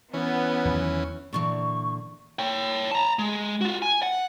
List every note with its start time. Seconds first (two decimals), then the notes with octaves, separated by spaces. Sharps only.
0.14 E3 B3 C#4
0.65 E2 D#3 F#3
1.33 A#2 D3 E3 C#6
2.39 C#5 G5
2.91 A5 A#5
3.19 G#3
3.61 F4 F#4
3.82 G#5
4.03 F#5